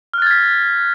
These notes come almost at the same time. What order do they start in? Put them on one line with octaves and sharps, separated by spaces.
F6 F#6 A6 G#6 B6